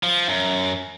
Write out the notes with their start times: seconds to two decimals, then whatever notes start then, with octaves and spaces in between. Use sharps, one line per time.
0.03 F3
0.28 F#2